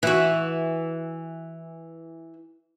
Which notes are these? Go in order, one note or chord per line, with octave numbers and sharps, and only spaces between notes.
E3 F#4